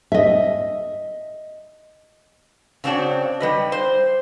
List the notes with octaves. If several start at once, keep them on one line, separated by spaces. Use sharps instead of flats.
D#5 E5
C#3 C4 D4 F#4 C#5
G3 B4 D#5
C5